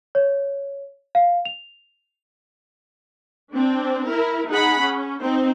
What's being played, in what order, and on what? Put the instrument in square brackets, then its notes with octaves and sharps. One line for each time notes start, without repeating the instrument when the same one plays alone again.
[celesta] C#5
F5
F7
[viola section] C4 D4
E4 A#4
D#4 G#4 F#5 B5
C#4
C4 D#4 C5